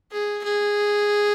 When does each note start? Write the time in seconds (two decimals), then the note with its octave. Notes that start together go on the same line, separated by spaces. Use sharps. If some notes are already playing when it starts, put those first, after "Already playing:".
0.12 G#4
0.44 G#4